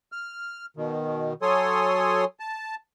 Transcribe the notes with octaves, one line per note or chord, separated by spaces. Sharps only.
F6
B2 D#3
F#3 A4 C#5 G#5 C6 D#6
A5